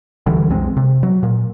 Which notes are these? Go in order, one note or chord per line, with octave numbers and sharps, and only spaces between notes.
D2 D3 E3 G3
B1 F2 G#3 C4
C3
F#3
A#2